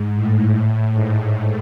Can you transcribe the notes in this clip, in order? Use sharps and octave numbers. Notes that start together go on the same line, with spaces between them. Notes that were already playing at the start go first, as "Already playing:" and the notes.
Already playing: G#2
A2
A2
G#2